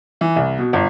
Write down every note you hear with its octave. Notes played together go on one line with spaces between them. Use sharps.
E3
C2
B2
G1